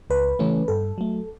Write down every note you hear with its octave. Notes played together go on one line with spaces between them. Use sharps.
C#2 B4
C#3 E3 A3 C#4
G2 A4
F#3 A3